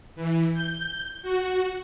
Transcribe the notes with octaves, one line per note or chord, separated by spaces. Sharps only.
E3
G6
F#4